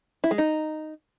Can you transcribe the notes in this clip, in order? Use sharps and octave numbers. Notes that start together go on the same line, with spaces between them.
E4
G#3
D#4